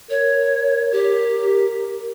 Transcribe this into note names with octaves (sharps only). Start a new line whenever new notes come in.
A#4 C#5
G4